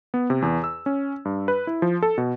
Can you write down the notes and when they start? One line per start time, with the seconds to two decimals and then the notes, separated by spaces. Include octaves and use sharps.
0.14 B3
0.30 C3
0.42 E2
0.64 E6
0.86 C#4
1.25 G2
1.48 B4
1.67 E4
1.82 F3
2.02 A4
2.18 B2